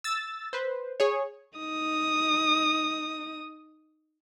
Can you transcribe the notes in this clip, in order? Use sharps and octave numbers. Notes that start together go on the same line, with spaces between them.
E6 A6
B4 C5
G#4 C#5
D#4 D#6